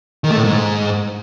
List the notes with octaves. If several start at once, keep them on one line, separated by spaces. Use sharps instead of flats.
D#3
A3
A2
G#2